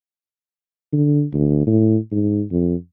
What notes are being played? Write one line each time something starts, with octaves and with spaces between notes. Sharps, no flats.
D3
D2
A2
G#2
F2